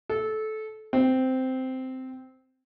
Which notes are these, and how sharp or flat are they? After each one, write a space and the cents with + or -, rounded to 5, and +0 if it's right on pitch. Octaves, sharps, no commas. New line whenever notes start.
A4 -20
C4 -10